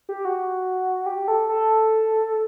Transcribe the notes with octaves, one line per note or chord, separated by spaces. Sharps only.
G4
F#4
G4
A4
A4